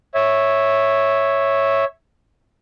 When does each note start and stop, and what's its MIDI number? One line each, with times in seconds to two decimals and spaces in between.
0.14 1.85 73
0.14 1.85 76